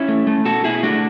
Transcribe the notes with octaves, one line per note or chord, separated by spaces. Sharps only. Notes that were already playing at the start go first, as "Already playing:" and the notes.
Already playing: C#4 E4
A3
A3
B2 F#4 A4
B2 E4 G#4
A3 D4 F#4